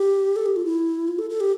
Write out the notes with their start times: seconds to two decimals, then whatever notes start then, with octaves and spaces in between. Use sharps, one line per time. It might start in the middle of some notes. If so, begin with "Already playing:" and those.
Already playing: G4
0.36 A4
0.46 G4
0.56 F4
0.66 E4
1.08 F4
1.19 A4
1.30 A4
1.40 G4